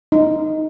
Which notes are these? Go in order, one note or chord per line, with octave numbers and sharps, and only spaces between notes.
D#4